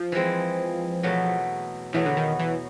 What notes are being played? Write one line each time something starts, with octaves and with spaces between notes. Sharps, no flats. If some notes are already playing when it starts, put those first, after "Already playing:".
Already playing: F3
E3 G#3 C4
E2 B2 F#3 A3
E2 B2 E3 F#3 A3
D3
D#3
E3